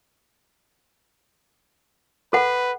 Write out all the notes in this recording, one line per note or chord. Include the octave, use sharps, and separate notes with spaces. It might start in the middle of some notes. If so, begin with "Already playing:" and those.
A4 B4 F#5